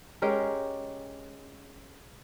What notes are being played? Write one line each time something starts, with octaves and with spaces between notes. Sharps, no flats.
G#3 C#4 G4 A#4